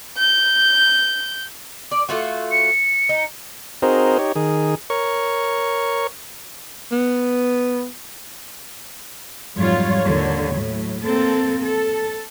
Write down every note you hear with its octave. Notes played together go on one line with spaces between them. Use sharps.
G6
D5
A3 F4 F#4
C#7
D#4
C4 D#4 F#4 G#4 A#4 C5
D#4 G4 C#5
D#3 G#4
A#4 C#5 C#6
B3
F2 G#2 F#3 G3 F4 C#5
D#2 D3 A#3 C#5
A2 F#3
A#3 C4 A4
A4